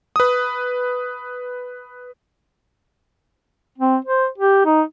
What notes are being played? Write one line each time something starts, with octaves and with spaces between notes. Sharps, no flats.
B4 D#6
C4
C5
G4
D#4